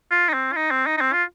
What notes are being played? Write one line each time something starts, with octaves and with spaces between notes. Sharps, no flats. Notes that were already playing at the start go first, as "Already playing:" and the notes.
F4
D#4
C4
F4
D#4
C4
D#4
D#4
C4
F4